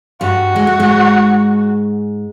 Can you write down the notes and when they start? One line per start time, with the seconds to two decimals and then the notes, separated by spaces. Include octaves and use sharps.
0.21 G2 G3 F#4
0.56 G#3
0.67 A3
0.79 G#2 G#3